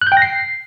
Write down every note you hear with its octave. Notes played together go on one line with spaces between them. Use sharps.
F#6
G6
G5
A#6
C7